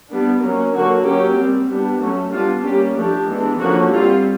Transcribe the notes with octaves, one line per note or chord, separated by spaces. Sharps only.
G3 B3 D4
F#3 A#3 C#4
D3 F#3 A#3 F#4
F#3 A#3 C#4 G4
G3 C4
G3 B3 D4
F#3 A3 C#4 F#4
G3 B3 D4 F4
G3 A#3 C#4 G4
F3 A3 D4 G4
E3 G#3 B3 D4
D3 F3 A#3 C#4 F#4
G3 C4 F4